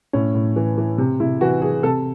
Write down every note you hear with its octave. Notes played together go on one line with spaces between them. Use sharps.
A2 C#4
A2
E3
E3
C3
C3 E4
E3 F#4
E3 G#4
C3 A4